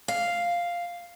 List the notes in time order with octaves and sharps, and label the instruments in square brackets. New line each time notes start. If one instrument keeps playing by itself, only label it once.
[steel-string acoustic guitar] F5